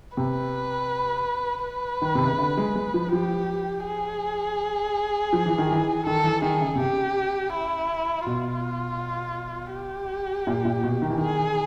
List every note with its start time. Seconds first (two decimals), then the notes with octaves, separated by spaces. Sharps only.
0.17 C3 B4
1.65 B4
2.02 D#3
2.15 C3
2.27 C#3
2.39 D3
2.57 G#3
2.75 G#3
2.94 F3
3.12 F3 G4
3.85 G#4
5.33 F3
5.46 E3
5.58 D#3
5.72 E3
6.06 D#3 A4
6.24 E3
6.42 D#3 G#4
6.61 C#3
6.75 C3
6.79 C#3 G4
7.53 E4
8.26 B2 F4
9.74 G4
10.47 A#2
10.65 A#2
10.83 B2
11.02 D#3
11.10 E3
11.18 D#3 G#4